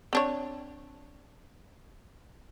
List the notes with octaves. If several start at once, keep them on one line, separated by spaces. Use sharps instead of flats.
C4 D4 C#5